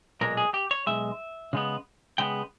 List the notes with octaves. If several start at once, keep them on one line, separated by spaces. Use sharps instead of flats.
B1 A#2 G#3 A#4
G#4
G4
C#5
B1 A#2 G#3 E5
C#3 G#3 B3
C#3 G#3 B3 G5